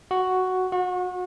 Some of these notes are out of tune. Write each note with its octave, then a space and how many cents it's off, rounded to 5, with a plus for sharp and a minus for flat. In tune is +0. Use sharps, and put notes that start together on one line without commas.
F#4 +0
F#4 -35